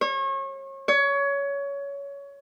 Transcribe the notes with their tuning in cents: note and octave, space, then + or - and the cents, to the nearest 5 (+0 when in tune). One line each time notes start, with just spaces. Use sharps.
C#5 -35
C#5 +20